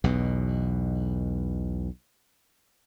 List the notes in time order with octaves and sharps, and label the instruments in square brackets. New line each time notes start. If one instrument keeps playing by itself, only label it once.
[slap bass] B1 E2 B2